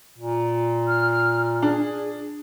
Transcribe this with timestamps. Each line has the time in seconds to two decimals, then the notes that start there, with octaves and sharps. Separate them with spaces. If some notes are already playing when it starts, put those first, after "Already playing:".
0.18 A#2
0.88 F6
1.62 D4 G#4